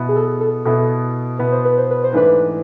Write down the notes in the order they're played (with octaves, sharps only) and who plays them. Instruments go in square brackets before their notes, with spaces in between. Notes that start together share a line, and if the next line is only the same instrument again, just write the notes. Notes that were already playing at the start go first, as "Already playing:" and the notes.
Already playing: [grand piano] B2 B3 E4
[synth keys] G#4
A4
A4
[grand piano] B2 B3 E4 [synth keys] A4
[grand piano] B2 B3 E4 [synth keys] B4
[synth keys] C5
B4
C5
B4
C5
[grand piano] G#2 E3 A3 D4 [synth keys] B4